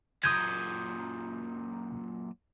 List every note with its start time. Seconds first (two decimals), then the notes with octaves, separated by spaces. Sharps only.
0.24 F#2 A#2 D#6 G6 G#6